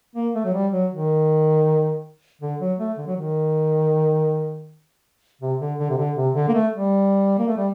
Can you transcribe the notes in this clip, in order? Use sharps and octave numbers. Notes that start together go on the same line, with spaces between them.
A#3
A3
F#3
G3
F#3
D#3
D3
F#3
A3
D3
F#3
D#3
C3
D3
D3
C3
D3
C3
D3
A#3
A3
G3
A#3
A3
G3